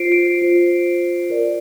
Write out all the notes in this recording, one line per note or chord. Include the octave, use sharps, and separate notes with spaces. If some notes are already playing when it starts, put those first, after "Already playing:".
Already playing: F4 C5 C7 D7
D7
F4 C5
F4 A#4 D5